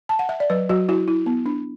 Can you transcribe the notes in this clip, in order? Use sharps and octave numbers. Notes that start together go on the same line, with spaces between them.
A5
F#5
E5
D5
F#3 B4
F#3 F#4
E4 F#4
E4
B3
D4